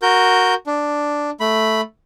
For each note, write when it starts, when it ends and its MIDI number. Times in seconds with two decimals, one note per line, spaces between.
0.02 0.54 66
0.02 0.54 70
0.02 0.54 91
0.66 1.30 62
1.40 1.81 57
1.40 1.81 83